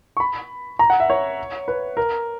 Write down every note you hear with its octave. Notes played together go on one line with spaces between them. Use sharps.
C#6
B5
A#5
F#5
E5
C#5
B4
A#4